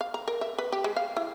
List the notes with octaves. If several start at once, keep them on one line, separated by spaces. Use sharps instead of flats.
F5
A#5
A#4
E5
B4
G4
G#3
F5
E4